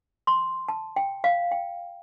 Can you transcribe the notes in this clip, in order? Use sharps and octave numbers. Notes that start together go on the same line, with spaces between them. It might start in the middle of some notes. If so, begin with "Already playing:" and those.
C6
A5
G5
F5
G5